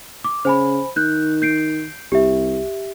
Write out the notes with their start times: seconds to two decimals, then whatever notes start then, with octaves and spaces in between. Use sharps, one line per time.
0.24 D6
0.45 C#3 C5 G#5 B5
0.96 D#3 F#6 G6
1.42 G6 C7 D7
2.12 C2 G4 E5